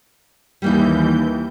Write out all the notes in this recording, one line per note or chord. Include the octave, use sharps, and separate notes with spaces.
D#2 E3 G3 A#3 D#4 G6